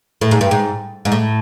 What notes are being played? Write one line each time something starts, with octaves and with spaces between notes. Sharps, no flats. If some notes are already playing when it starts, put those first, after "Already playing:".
A2
G#2
G2
G#2
G#2
A2